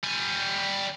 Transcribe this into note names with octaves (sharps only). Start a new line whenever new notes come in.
G3 G#5